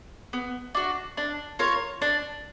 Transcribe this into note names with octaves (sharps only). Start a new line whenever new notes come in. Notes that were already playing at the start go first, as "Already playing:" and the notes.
B3
D4 F#4
D4
F4 A#4 C#5
D4